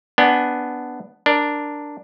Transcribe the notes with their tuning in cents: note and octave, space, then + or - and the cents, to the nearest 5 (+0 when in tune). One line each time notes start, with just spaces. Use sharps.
B3 +5 D4 +0 G#5 +0
D4 +0 A#4 +0